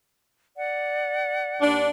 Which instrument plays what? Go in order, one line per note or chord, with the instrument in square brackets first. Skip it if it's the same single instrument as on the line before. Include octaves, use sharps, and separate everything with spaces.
[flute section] D5 F#5
[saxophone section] D#2 D4